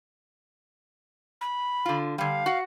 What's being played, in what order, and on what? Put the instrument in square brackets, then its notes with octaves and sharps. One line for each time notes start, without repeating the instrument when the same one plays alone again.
[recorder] B5
[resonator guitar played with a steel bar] D3 F4
[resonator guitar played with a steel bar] D3 G3 [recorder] F5
[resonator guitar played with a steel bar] F#4 F#5